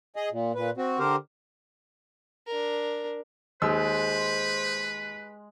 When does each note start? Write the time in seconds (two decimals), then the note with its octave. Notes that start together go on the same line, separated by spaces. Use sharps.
0.16 G#4 D#5
0.32 A#2
0.55 A#2 B4
0.77 C4 F#4
0.99 D3 G4 A#4 C5
2.47 D4 A#4
3.62 D#2 G#3 B4 C5 E6